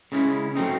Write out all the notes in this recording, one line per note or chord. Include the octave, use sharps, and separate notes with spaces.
C#3 G#3 C#4 E4
F#3 A3 C4 D#4